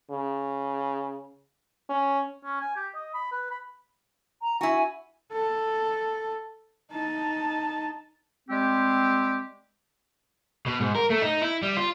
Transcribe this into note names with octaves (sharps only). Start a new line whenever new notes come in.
C#3
C#4
C#4
G#5
G4
D#5
B5
B4
B5
A#5
E4 F#4 G#5
A4
D#4 A5
G3 G#3 C4 G4
B2
G#2
A#4
A3
D#4
E4
G3
F4